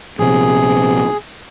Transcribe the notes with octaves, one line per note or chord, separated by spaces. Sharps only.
A#1 C3 G#4